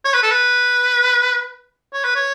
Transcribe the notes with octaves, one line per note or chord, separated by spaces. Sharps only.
C#5
B4
A4
B4
C#5
B4
C#5